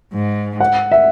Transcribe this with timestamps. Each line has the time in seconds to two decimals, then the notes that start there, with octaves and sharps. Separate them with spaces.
0.13 G#2
0.60 F#5
0.92 E5